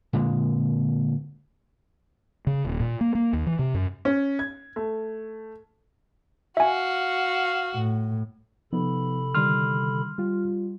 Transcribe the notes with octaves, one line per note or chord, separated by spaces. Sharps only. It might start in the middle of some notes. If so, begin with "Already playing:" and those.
A#2 D3 G#3
C#3
D#1
A#2
A#3
A#3
D#2
E3
C3
F#2
C#4
G#6
A3
F#4 E5 F5 G#5
A2
C3 F3 B3 D#4 A4 B5
D3 D#3 G3 C6 F6
G3 F4